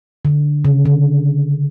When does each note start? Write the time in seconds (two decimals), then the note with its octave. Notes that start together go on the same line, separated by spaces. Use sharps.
0.25 D3
0.65 C#3
0.85 D3